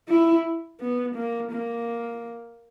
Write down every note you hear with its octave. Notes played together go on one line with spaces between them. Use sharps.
E4
B3
A#3
A#3